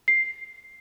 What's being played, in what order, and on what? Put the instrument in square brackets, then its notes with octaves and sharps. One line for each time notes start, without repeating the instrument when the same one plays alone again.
[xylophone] C7